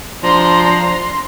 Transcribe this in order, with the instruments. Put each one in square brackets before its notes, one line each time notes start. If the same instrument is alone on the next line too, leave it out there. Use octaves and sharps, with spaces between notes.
[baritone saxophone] F3 [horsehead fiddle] D4 A#5 [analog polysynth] C6